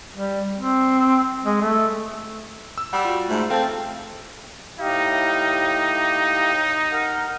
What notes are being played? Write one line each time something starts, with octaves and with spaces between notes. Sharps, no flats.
G3
C4
G#3
A3
E6
G3 F#5 E6 E7
F4 F#4
G#2 A3
C4 A4 F5 A5
A2 D#4 G4 F5
A#4 F#5